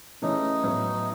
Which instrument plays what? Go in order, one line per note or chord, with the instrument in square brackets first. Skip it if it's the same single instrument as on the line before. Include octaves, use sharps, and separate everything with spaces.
[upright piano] C#3 E3 A3 C#4 [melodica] D#4
[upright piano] A2 F#3 B3